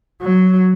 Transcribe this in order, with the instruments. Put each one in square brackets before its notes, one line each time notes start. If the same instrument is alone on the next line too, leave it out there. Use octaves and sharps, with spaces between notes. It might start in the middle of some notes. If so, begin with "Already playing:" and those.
[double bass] F#3